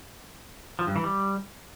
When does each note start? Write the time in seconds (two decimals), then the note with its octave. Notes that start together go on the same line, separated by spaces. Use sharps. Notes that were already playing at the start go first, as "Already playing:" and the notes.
0.79 F3
0.87 G2
0.96 E3
1.04 G3